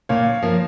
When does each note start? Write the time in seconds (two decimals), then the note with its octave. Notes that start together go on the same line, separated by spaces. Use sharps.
0.09 A#2 C#5 F5
0.42 F3 A#3